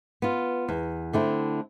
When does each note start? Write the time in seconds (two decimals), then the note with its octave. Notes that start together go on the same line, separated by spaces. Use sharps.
0.22 B3 F4
0.69 E2
1.13 D3 A3 C4 E4